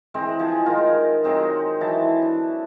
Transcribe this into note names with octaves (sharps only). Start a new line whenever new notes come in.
E3 G#3 C4 C5
F3 G#4 G#5
D#3 G#3 F4 A#4
F#3 G#3 C4 D#4
E3 F#3 E5 A5
D4